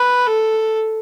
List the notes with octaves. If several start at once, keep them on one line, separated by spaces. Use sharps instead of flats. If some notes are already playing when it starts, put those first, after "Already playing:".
Already playing: B4
A4